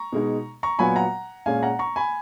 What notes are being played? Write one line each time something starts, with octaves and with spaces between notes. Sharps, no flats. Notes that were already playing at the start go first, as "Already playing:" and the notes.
Already playing: A#5 C#6
B2 G#3 D#4
A#5 C#6
A#2 F#3 B3 F4 G#5 B5
F#5 A#5
A#2 G#3 C#4 F5 G#5
F#5 A#5
A#5 C#6
G#5 B5